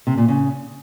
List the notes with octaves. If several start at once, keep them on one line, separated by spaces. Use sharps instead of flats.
C3
A#2
C#3